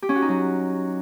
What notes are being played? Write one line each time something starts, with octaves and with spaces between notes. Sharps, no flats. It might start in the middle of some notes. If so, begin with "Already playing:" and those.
G4
C#4
F#4
D#4
F#3